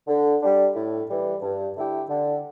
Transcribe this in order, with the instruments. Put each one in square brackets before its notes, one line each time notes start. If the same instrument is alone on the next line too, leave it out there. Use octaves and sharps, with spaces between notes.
[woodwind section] D3
G3 D4
A2
E3 G3
G2
D3 A3 E4 G4
D3